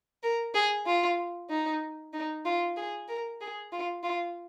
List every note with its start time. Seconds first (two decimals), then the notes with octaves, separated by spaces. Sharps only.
0.23 A#4
0.54 G#4
0.87 F4
1.50 D#4
2.13 D#4
2.45 F4
2.77 G#4
3.08 A#4
3.41 G#4
3.72 F4
4.03 F4